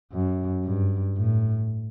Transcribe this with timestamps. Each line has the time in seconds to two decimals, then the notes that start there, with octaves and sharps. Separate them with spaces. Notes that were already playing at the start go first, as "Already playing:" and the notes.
0.12 F#2
0.65 G2
1.16 A2